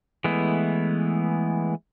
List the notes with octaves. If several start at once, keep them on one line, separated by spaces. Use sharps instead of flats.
E3 G#3 A3 B3 E4